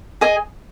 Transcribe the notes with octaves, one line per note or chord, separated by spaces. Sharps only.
G#4 D#5 G#5